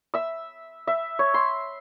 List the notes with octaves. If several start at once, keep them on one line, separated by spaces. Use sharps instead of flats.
E5 E6
E5
C#5
C6